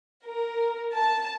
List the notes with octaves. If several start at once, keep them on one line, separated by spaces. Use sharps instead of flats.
A#4
A5